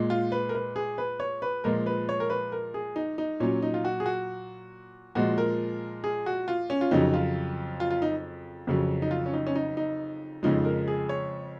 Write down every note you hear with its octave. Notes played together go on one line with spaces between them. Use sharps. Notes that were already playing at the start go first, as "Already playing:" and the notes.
Already playing: A#2 G#3
F4
B4
A#4
B4
G#4
B4
C#5
B4
A#2 F3 G#3 A#4
B4
C#5
A#4
B4
A#4
G#4
D#4
D#4
A#2 F#3 C#4
D#4
F4
F#4
G#4
F#4
A#2 F3 G#3 F#4
A#4
G#4
F#4
F4
C#4
F4
F2 C#3 F#3 D#4
F4
F4
F4
D#4
F2 C#3 F#3
D#4
F4
C#4
D#4
C#4
D#4
D#4
F2 C#3 F3 G#3 D#4
A#4
G#4
C#5